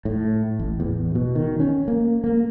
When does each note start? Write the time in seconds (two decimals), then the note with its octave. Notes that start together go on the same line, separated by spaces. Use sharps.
0.05 A2
0.59 A1
0.80 E2
1.15 B2
1.35 D#3
1.60 C#4
1.88 A#3
2.24 A#3